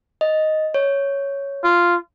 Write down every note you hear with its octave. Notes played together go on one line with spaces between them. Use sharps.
D#5
C#5
F4